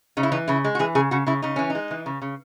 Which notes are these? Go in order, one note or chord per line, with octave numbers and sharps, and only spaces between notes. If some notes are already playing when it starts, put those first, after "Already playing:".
C#3 D#4
E4
E3 D#4
C#3 E4
G#3
F#4
E3 G#4
C#3 G#4
C#3 F#4
C#3 E4
C#3 D#4
E3 C#4
D#4
G#3
E3
C#3
C#3